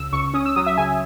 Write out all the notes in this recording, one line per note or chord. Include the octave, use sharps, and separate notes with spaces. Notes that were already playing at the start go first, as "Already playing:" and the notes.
Already playing: C#2 C#3 E6
C#2 C#6
C#4 D#6
E6
F#3 D#6
E5
C#3 G#5